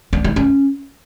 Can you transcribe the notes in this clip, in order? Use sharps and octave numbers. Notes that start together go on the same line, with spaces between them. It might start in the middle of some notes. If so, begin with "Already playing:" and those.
D4
D#4
C#4